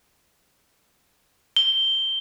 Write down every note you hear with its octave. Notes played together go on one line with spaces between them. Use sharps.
G7